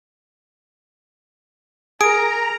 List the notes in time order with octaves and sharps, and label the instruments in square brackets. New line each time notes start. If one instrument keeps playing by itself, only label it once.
[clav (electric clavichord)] G#4 [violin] A#4 [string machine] A#5 [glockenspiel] D7